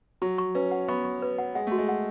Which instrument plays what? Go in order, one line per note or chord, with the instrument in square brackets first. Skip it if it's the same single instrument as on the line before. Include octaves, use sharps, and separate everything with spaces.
[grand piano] F#3 [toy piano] C#6
[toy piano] C#6
[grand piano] C#4 [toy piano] B4
[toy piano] F#5
[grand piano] B3 [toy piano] C#6
[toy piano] C#6
B4
F#5
[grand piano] G#3 [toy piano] F#5
[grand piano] A3 [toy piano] F#4
[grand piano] G#3
[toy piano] F#5